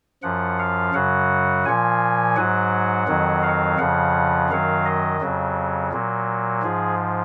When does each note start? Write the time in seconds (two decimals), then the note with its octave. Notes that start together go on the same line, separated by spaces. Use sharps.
0.23 F#2 F3 F#5
0.59 F5
0.94 F#2 C#3 F#3 F#5
1.65 A#2 F3 G#5
2.36 G#2 F#3 F#5
3.08 F2 D#3 F#3
3.43 F5
3.78 F2 C#3 F3 F#5
4.50 F#2 D#3 F#3 F5
4.85 D#5
5.21 F2 C#3 F#3
5.92 A#2 F#3
6.63 G#2 F3 G#4